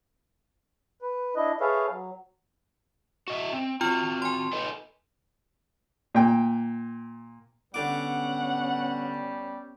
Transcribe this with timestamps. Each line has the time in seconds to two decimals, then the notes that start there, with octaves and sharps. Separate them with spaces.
1.02 B4
1.36 D4 E4 D#5
1.61 G#4 A4 B4 C#5 E5 F5
1.90 F#3
3.28 F#4 D#5 E5
3.53 C4
3.81 C4 F4 F#4 F6
4.22 G#5 C6
4.53 A4 B4 D#5
6.15 A#2 G5
7.74 D3 G3 B3 C#4 F#5 D6